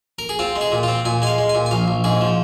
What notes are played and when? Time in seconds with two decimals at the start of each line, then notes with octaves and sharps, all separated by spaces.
0.19 A#4
0.29 G#4
0.39 C4 F4
0.56 G#3
0.61 G#4
0.72 A#2
0.83 C4 F4
1.05 A#2 G#5
1.22 G#3 G#5
1.27 F5
1.38 G#3
1.49 G#5
1.55 A#2
1.66 G#5
1.71 A#1 F5
1.88 A#1
2.04 G#2 G#4
2.21 F3